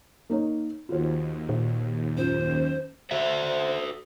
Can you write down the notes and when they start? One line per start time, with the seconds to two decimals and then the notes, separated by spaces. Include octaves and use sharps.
0.30 A#3 D#4 C#5
0.89 D#2 F4 F#4 C5
1.49 A#2
2.17 F#2 F4 C5
3.11 F#4 A4 C5 E5